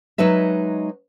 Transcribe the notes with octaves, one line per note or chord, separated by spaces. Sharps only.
F#3 G#3 D#4 B4 E5